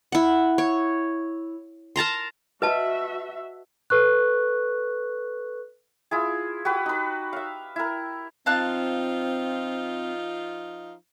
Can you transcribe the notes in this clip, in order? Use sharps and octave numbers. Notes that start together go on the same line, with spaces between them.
E4 F#5
C#5
A#4 A5 A#5 C6
F#4 B4 D#5 E5 A5
A4 B4 C#6 F#6
E4 F4 G#4
F#4 G4 B4
D#4 B4
E5 F5
E4 A#4
F3 C4 D#4 F4 F5 A5 F#6